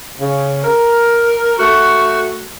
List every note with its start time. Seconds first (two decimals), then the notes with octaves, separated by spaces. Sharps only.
0.20 C#3
0.64 A#4
1.58 A3 F#4